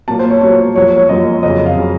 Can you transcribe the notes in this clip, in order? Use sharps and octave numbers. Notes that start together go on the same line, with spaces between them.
A#2 F#3 A#3 A5
C5
C#5
A#2 F#3 A#3 C#5
F#2 F3 A#3 C#5
C#5
C#5
F#2 F3 A#3 D#5
F2 C#3 F#3 D#5
F5
C#3 F#3